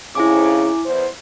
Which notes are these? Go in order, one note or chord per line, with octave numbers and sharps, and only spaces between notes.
F2 G#2 C#3 E4 G#5 D6
E2 C5